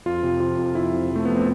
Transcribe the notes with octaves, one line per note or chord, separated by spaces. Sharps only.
F2 F4
C3
F3 F4
F2
F2 E4
C3
F3
A3
F2 B3
C4